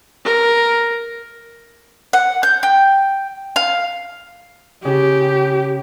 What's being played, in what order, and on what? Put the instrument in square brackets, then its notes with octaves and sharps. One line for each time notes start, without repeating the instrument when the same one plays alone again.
[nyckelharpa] A#4
[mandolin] F#5
G6
G5
F5
[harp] C#3 [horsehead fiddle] G4